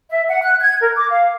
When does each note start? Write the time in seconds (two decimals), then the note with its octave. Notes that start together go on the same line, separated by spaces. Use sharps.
0.09 E5
0.29 F#5
0.43 F#6
0.60 G#6
0.80 A#4
0.95 D6
1.09 F5